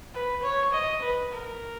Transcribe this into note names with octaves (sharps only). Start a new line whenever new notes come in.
B4
C#5
D#5
B4
A#4